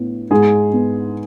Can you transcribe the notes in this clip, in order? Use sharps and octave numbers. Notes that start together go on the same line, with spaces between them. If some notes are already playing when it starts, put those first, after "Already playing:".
Already playing: A2 B3
G#2 G#3 G#4
B3